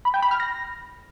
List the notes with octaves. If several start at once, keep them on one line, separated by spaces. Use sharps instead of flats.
B5
G5
B5
F6
A#6